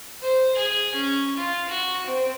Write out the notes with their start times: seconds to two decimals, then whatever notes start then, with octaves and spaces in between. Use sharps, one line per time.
0.22 C5
0.56 G#4
0.95 C#4
1.37 F4
1.69 F#4
2.07 C4